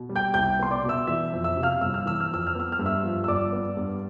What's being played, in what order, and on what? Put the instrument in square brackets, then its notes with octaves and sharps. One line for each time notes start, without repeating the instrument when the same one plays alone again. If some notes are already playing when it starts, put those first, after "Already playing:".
Already playing: [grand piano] B2
G3
G5 G6
C2 G5 G6
B3 C6
D5 D6
B2
E5 E6
E3 E5 E6
F2
E5 E6
C3
F5 F6
G1 E6
F6
E3 E6
F6
F2 E6
F6
B3 E6
F6
G2
E5 E6
F3
E6
G1 D5 D6
B3
G2